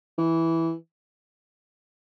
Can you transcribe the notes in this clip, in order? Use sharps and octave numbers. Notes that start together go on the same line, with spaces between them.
E3